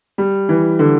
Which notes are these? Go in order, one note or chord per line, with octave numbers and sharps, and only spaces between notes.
G3
E3
D3